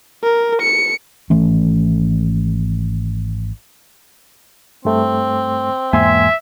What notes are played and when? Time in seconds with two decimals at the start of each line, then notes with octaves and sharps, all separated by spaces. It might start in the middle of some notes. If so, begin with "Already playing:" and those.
0.23 A#4
0.62 C#7
1.30 G#1 E3 A3 C#4
4.85 G2 A3 C4
5.93 E2 G#2 A#3 E5 G#5 C6 G#6